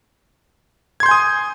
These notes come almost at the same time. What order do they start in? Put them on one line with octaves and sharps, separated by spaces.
G#6 C6 G6 G#5 D#6